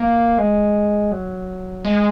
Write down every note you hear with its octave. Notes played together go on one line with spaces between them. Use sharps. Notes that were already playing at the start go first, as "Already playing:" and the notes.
Already playing: A#3
G#3
F#3
G#3